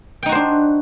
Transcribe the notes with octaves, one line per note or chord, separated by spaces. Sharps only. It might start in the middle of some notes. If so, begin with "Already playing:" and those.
D4 D#4 F#4 C5 G5